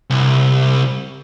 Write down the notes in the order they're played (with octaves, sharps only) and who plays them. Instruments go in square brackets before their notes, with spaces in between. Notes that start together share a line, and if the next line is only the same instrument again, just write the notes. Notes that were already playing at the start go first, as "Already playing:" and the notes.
[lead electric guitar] C2